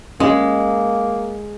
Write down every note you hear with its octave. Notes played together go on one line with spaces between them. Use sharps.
G#3 A#3 C#4